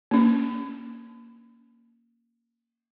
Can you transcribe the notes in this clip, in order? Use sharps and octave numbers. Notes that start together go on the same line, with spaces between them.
A#3 C#4